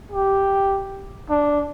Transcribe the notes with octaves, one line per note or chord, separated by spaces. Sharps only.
G4
D4